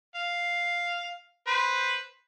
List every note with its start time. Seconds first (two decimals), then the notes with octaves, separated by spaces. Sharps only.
0.15 F5
1.47 B4 C5